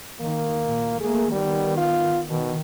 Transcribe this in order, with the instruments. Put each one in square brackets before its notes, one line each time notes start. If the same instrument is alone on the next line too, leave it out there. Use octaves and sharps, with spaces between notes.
[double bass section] D#3 [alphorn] A#3
[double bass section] A#2
[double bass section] A3 A#3 [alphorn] G#4
[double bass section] D#3 B3 [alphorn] G3
[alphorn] F4
[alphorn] B2 [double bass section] D#3